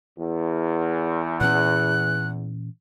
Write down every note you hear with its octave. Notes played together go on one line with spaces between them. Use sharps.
E2
A#2 E3 C#4 F#6